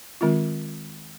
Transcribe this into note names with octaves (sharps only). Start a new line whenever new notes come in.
D#3 G#3 C4 F4